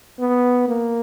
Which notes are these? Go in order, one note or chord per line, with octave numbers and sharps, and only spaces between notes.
B3
A#3